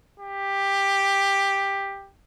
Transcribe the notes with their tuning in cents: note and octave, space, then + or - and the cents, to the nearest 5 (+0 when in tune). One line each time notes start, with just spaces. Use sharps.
G4 +10